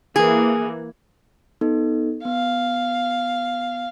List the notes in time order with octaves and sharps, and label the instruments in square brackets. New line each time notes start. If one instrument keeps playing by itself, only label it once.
[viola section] E3 A#3 [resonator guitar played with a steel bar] G#4
[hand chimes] B3 D#4 A4
[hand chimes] B3 [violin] F5